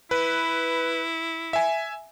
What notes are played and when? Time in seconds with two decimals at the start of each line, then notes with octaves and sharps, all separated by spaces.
0.11 E4 B4
1.53 E5 G#5